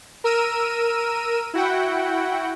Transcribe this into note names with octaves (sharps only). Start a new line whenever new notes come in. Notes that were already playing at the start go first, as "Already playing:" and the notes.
A#4 E6 D#7
E4 F#4 F#5 G5